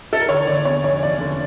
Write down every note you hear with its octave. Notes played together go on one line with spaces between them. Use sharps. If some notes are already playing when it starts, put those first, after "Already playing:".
A4
A#4
D3 C#5
D3 D5
E2 C#5
F1 C#5
F1 D5
D3